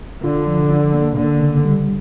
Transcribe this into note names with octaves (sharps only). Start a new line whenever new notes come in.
D3 F4
F3
D4
A#3
D3 A#3
C#3
G3